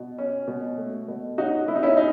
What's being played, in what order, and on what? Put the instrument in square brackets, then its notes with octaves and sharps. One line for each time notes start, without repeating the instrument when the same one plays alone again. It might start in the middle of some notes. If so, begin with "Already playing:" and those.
Already playing: [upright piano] B2
C#4
B2
A3
B2
C#4 D#4 F#4
B2 E4
D#4
C#4 E4
D#4